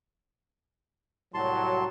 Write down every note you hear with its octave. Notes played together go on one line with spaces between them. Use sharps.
C2 A2 F#3 A5 C6